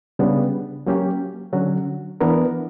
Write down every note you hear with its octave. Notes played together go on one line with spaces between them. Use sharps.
C#3 G3 B3 D4
F#3 A#3 C#4 G4
D3 F#3 C#4 F#4
E3 B3 D4 A#4